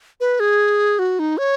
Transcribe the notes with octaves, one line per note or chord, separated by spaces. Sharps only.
B4
G#4
F#4
D#4
C#5